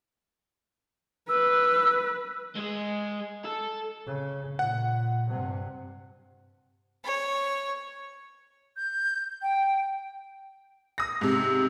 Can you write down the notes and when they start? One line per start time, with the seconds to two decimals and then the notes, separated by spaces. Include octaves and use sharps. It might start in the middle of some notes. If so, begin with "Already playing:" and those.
1.29 B4 E6
2.55 G#3 G#4
3.45 A4
4.06 C#3
4.59 A#2 F#5
5.29 G2 C3
7.05 C#5
8.76 G6
9.42 G5
10.98 D#6 A#6
11.21 G#2 C3